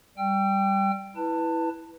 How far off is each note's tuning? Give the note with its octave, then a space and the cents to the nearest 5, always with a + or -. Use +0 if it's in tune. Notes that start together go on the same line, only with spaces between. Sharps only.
G3 +0 G5 +0 E6 +40
E4 -5 B4 +0 A5 +25